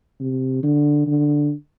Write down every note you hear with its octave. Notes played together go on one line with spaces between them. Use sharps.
C3
D3
D3